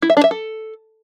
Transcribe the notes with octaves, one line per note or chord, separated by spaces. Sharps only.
E4
E5
D4
E5
A4